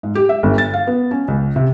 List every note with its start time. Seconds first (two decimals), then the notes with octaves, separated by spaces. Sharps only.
0.03 G#2
0.15 G4
0.29 E5
0.43 G1
0.58 A6
0.73 F5
0.87 B3
1.11 C#4
1.28 C#2
1.56 C3